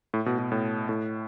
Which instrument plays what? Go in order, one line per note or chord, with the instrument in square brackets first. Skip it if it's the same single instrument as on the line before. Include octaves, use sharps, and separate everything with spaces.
[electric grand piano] A2
B2
B2
A2
A2